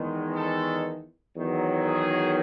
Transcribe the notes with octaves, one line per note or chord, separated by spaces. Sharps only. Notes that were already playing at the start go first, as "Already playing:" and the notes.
Already playing: E2 D#3 G#3
A4
E2 D#3 F#3
G#4